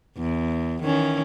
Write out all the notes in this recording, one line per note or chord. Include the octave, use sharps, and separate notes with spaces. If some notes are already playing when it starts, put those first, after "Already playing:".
E2
D#3 E3 C#4